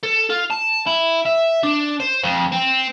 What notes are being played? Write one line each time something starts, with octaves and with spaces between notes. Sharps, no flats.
A4
F4
A5
E4
E5
D4
C5
F2
C4